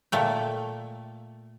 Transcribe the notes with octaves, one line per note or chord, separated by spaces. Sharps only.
A#2 A3 G5